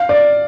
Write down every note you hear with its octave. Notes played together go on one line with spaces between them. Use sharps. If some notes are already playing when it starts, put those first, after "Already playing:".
Already playing: F5
D5